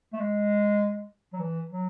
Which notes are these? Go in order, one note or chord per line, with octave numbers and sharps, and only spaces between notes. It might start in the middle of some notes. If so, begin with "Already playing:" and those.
A3
G#3
F#3
E3
F#3